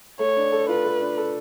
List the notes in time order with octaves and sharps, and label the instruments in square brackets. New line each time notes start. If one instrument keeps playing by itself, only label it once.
[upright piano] A3 [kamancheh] C#5
[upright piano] D4
A4
[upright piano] F4 [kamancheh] B4
[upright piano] A3
D4
A4